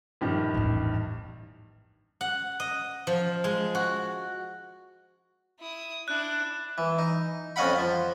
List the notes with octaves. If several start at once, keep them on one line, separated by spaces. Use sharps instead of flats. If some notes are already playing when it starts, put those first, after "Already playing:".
A#1 G2 D#3
A1 E2
F#5
D#5
F3
G#3
F#4
E4 D#6
D4 E4 F#6
E3
D#4
F2 C#4 D#5 F5 F#5 B5
F3